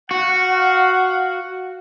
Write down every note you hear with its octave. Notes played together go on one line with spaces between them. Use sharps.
F#4 F5 F#5